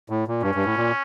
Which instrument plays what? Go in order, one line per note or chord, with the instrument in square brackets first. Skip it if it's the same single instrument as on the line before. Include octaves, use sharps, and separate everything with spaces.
[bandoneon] A2
A#2
[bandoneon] G2 [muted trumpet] C#4
[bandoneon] G2
A2
A#2